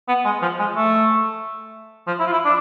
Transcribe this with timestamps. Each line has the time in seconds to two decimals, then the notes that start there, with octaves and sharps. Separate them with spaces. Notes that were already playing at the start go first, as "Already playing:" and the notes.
0.08 B3
0.25 G#3
0.42 F3
0.59 G#3
0.76 A3
2.07 F3
2.20 E4
2.27 F4
2.32 E4
2.45 D4